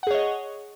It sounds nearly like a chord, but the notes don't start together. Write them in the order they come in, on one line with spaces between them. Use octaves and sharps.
F#5 G#4 C#5 D#5